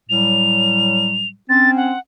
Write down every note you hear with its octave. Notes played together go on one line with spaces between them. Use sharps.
A2 F#3 G3 F7
C4 C#4 A6
F#5